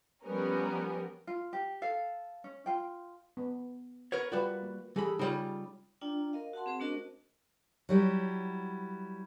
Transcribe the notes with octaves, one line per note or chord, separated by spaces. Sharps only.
F3 G3 B3 C#4 A#4
F4
G4
A4 F5
C#4
F4 G5
B3
A#4 B4 C#5
G3 F4 F#4 A#4 B4 D5
A#3
E3 G3 G#4 A4 B5
C#3 G3 D#4 F4 C#5
D4 F4 D5 G5 A#5
A#4 D#5 F5
F#4 F#5 A5 C6
C4 G#4 C5
A3 C#4 D4 F#4 A#4 D#5
F#3 G3 E4